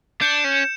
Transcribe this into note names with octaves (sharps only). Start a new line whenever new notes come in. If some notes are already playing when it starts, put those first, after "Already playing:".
D4 G6 C#7 E7
C#4